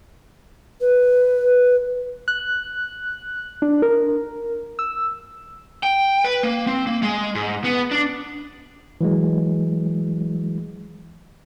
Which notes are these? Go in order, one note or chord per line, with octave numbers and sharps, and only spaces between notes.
B4
F#6
D4
A#4
E6
G5
B4
A#3
C4
A#3
G#3
G#2
B3
D4
E3 F#3 G#3